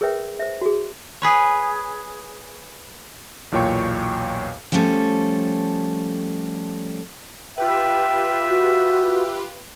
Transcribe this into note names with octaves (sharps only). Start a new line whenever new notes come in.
G#4 A#4 B4 C#5 E5 G5
C5 E5
F#4 G#4
G#4 B4 C#5
B1 E2 A#2 C#5 G5 C#6
F3 G3 A3 C#4 A4
F4 G4 B4 E5 G5
F#4